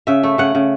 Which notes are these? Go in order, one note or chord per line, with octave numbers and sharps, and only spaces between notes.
C#3 E5
A3
C#3 F#5
C#3